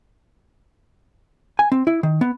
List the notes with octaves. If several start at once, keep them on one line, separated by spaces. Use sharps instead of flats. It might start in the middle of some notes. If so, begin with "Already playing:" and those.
G#5
C4
E4
D#3
B3